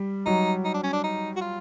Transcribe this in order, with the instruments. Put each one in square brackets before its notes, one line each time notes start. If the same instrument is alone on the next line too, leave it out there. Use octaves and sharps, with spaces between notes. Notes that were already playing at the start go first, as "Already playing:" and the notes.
Already playing: [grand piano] G3
[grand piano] F#3 [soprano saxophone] D#4
[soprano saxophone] D#4
D4
C#4
D4
D#4
F#4
F4